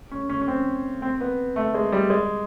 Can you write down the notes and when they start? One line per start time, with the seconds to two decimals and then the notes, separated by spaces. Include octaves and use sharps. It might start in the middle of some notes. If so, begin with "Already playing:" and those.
0.11 C#4
0.29 C#4
0.41 C#4
0.48 C4
1.02 C4
1.21 B3
1.56 A3
1.74 G#3
1.92 G3
2.10 G#3